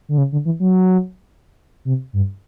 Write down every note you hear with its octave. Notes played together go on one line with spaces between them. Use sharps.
D3
C#3
D3
E3
F#3
C3
G2